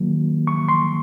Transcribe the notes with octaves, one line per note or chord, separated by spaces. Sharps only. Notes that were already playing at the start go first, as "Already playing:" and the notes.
Already playing: D#3 F#3 A#3
C#6
C6